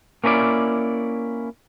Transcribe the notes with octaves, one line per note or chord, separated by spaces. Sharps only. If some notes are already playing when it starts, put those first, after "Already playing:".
A#3 C#4 E4 A#4 D5